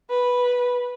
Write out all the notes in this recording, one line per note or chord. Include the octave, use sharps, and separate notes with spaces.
B4